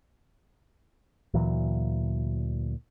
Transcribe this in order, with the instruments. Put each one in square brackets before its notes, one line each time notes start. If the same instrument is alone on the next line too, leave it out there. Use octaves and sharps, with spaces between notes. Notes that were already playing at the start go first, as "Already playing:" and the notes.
[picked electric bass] D2 A#2 E3 F#3